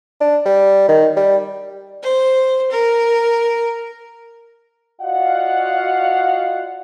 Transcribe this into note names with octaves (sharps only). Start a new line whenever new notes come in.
D4
G3
D#3
G3
C5
A#4
F4 F#4 D5 D#5 F5 F#5